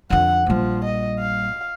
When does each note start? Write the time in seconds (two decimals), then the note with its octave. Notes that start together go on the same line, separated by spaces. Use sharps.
0.10 F2 D3 F#5
0.46 A#1 F3 G3
0.85 D#5
1.20 F5